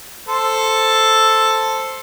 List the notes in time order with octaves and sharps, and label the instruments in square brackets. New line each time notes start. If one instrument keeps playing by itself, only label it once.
[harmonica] A4 C5